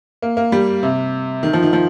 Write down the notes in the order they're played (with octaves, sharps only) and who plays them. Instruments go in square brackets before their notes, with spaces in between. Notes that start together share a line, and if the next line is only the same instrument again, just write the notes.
[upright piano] A#3
A#3
G3
C3
D#3
F3
D#3
F3